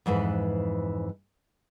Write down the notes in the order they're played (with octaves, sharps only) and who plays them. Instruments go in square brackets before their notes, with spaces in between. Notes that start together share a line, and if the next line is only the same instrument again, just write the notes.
[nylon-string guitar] F2 G#2 E3 B4